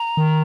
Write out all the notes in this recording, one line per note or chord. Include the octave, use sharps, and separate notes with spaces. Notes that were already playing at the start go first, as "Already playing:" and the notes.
Already playing: A#5
D#3